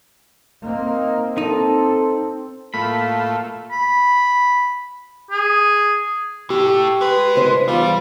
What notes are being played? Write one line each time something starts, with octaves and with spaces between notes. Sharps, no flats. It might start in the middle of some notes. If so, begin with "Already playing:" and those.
A#3 C4 D#4
C4 D#4 A4
A2 A3 A#3 F4 B5
B5
G#4
A3 E4 G4
G#3 B4
D2 G#2 C5
E2 G3 F4